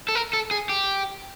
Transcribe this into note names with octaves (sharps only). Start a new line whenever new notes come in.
A4
A#4
A4
G#4
G4